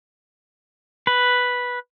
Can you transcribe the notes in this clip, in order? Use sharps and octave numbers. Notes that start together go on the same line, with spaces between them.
B4